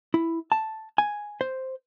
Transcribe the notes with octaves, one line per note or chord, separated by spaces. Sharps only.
E4
A5
G#5
C5